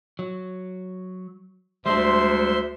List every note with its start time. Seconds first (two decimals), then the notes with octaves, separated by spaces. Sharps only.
0.19 F#3
1.86 D2 G3 G#3 D4 C5 E5 C6